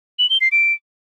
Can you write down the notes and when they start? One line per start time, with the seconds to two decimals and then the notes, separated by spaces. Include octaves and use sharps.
0.19 F#7
0.30 G7
0.41 C7
0.52 D7